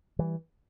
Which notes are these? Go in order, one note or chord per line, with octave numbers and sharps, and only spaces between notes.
E3 G3